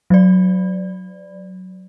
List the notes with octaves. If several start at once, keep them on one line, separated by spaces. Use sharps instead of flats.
F#3 D5